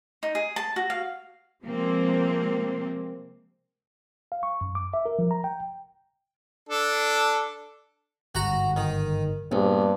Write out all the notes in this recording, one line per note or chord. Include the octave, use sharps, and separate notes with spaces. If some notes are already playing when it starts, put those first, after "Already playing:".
D#4
G#4
A5
F#4
F5
C3 F3 G#3 A#3 C4
F5
C#6
F#2
D6
E5
A#4
F3
A#5
G5
D4 A4
G1 G#2 F#4 F#5 A#5
D#3
A#1 G2 B3